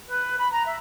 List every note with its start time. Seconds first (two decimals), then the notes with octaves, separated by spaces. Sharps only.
0.07 B4
0.37 B5
0.51 A#5
0.65 E5